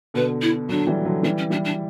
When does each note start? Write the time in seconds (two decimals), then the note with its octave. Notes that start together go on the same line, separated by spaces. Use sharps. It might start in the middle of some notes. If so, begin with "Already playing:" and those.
0.14 B2 D3 B4
0.41 E4
0.69 D3 F#3 D4
0.87 E3 G3
1.05 D3 F#3
1.23 E3 G3 D4
1.37 C#4
1.50 E3 G3 D4
1.64 D4